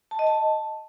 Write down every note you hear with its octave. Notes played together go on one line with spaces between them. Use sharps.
A5
D#5
A5